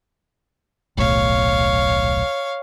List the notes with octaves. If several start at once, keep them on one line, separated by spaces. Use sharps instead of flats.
D#1 B1 A2 C#5 F5